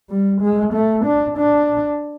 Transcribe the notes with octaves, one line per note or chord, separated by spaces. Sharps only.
G3
G#3
A3
D4
D4